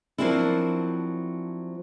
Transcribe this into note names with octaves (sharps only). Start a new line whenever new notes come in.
F3 F#3 A#3 C4 D4 E4